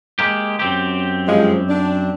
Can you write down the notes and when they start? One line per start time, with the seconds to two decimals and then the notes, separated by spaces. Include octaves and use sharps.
0.19 G#3 A#3 G4
0.59 F#2 C4 G4
1.27 G2 F3 G#3
1.69 D4